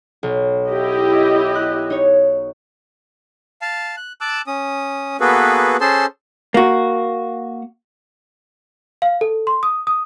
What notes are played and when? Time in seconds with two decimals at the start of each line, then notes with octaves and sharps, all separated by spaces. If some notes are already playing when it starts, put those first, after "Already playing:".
0.23 B1
0.70 E4 G4 D#5
1.55 F#6
1.90 D#4 C#5
3.62 F5 A5
3.97 F#6
4.21 A5 D6 E6 F#6
4.47 C#4 D#6
5.20 A#3 B3 F#4 G#4 A4 B4
5.81 C#4 G#4 A4 C5 A5 C6
6.54 A#3 F#4
9.02 F5
9.21 A4
9.47 C6
9.63 D#6
9.87 D#6